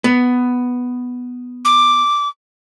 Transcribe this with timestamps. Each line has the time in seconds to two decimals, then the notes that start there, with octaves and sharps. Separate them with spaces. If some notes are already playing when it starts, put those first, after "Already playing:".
0.04 B3
1.65 D6